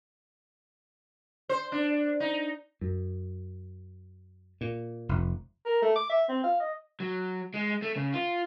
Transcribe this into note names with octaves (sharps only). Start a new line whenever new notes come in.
C5
D4
D#4
F#2
A#2
F1
A#4
A3
D6
E5
C4
F5
D#5
F#3
G#3
A3
C#3
F4